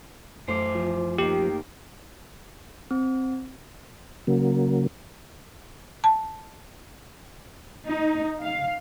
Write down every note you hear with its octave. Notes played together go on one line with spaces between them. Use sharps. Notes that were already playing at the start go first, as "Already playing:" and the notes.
F#2 E3 A3 C5 D6
F3
D#3 A#3 G4
C4
C#3 F#3 A#3
A5
D#4
F5